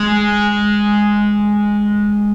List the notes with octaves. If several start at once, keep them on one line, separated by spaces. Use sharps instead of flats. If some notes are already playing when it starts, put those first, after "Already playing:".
Already playing: G#3